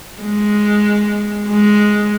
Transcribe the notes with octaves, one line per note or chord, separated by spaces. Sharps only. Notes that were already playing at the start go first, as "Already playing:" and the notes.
G#3
G#3